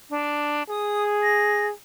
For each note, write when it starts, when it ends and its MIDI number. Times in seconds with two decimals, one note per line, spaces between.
0.10 0.63 62
0.70 1.73 68
0.70 1.03 87
1.23 1.66 94